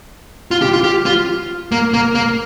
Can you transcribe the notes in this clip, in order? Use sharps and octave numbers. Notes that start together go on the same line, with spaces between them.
F4
G4
F4
G4
F4
A#3
A#3
A#3